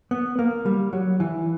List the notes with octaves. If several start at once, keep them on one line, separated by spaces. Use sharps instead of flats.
B3
A#3
G3
F#3
E3